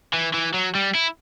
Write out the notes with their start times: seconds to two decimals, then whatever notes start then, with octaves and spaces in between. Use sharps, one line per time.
0.14 E3
0.34 E3
0.54 F#3
0.75 G3
0.95 E4